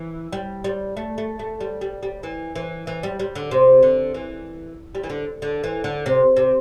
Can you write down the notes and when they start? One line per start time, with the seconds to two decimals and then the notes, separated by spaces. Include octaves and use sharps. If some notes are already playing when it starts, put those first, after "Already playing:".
Already playing: E3
0.32 G3
0.64 G3
0.97 A3
1.18 A3
1.39 A3
1.60 G3
1.81 G3
2.03 G3
2.23 E3
2.55 E3
2.87 E3
3.03 G3
3.19 G3
3.35 D3
3.51 C3
3.83 D3
4.14 E3
4.95 G3
5.04 E3
5.09 D3
5.42 D3
5.64 E3
5.84 D3
6.06 C3
6.36 C3